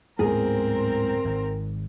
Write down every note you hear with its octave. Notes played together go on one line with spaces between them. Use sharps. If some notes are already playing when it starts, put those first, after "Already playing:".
D1 G#2 B3 C4 G#4 A#4
G#1